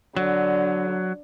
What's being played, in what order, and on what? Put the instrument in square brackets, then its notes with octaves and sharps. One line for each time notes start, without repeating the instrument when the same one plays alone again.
[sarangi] D3 [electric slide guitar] F#3